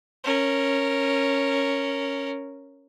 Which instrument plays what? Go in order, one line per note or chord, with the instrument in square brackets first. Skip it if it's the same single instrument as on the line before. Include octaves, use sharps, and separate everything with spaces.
[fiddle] C#4 A#4